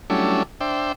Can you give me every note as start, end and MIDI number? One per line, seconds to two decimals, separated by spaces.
0.10 0.43 54
0.10 0.43 55
0.10 0.43 57
0.10 0.43 61
0.10 0.43 62
0.10 0.43 64
0.61 0.92 62
0.61 0.92 72
0.61 0.92 76
0.61 0.92 79